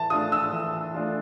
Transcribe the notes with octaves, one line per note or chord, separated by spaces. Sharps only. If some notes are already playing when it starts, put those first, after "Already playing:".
Already playing: E3 A5
A3 D4 F4 D#6
E6
E3
A3 D4 F4